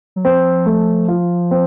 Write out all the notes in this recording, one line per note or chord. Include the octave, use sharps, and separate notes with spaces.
F#3
F3 C4
A3
F4
C4